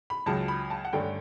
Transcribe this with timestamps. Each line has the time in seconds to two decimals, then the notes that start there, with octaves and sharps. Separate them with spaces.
0.10 B5
0.26 C#2 C#3 F#3 A5
0.48 B5
0.70 A5
0.85 F#5
0.93 G2 D3 A3 C#4 G5